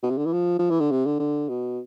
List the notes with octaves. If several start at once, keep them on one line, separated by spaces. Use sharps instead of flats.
B2
C3
D3
E3
F3
F3
E3
D3
C3
D3
D3
B2